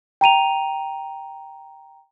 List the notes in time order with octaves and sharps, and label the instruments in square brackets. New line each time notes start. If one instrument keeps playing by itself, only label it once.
[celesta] G5 A#5 D#7 F7